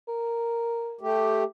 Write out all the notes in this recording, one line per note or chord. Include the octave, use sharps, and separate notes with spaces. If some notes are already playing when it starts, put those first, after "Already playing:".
A#4
A3 G4